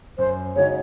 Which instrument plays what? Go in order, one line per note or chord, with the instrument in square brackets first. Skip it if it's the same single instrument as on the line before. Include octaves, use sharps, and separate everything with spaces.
[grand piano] F#2 [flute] C5
[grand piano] C#3 G#3 D#4 F#4 [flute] C#5